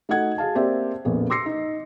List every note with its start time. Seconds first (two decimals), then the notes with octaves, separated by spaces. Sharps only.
0.09 A3 D#4 F#4 A4 F#5 G#6
0.38 F#4 G#4 F5 A5
0.55 A#3 C4 G4 C5 D5 E5
1.05 A#1 F2 A#3 B3
1.30 C6 D6 E6 A#6 C7 C#7
1.46 D#4